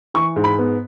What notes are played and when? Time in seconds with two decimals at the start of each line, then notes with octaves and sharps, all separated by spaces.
0.14 E3 C#6
0.36 G#2
0.44 B5
0.59 B3